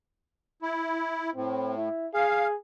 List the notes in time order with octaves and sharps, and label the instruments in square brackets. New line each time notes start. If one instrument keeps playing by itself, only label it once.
[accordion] E4
[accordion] A2 [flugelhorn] C4
[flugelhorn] E4
[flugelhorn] G#4 [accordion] F5